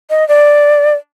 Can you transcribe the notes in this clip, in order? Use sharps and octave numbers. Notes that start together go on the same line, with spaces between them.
D#5
D5